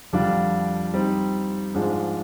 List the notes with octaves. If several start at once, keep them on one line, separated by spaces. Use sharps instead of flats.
F2 D3 G3 D4 F4
G3 C4 D#4
G#2 F3 G#3 D4